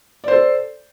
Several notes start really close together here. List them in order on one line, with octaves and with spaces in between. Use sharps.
D5 C5 A4